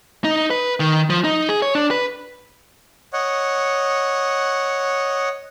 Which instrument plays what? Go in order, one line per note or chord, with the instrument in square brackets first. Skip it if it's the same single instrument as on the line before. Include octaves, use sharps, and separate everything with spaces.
[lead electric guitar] D#4
B4
D#3
F3
D#4
G#4
C#5
D4
B4
[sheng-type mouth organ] C#5 D#5 F#5